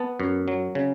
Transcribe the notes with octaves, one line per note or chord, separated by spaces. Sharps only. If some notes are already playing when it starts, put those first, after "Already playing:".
Already playing: B3 A5
F#2
F#3
C#3